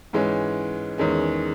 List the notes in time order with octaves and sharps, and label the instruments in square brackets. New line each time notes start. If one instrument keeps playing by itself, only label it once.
[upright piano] G#2 E3 G#3 C#4
E2 D#3 G#3 C#4